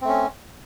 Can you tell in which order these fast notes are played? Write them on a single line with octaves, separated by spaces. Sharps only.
C4 A3 C#4